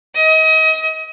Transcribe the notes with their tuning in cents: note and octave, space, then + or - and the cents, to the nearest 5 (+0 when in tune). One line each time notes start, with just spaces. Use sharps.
D#5 +35